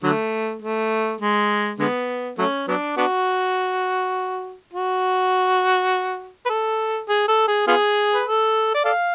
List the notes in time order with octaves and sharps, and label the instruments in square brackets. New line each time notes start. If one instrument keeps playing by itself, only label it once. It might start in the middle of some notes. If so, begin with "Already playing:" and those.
[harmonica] D3 F#3 A3
A3
G#3
D3 G#3 B3
F#3 A3 C#4
F#3 B3 D4
B3 D4 F#4
F#4
B4
A4
G#4
A4
G#4
B3 F4 G#4
B4
A4
D5
A4 D5 F5